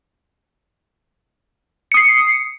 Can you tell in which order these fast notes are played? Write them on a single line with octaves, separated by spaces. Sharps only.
C#7 D#6 C7